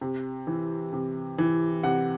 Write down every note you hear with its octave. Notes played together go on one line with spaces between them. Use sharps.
C3
E3
C3
E3
C3 F#5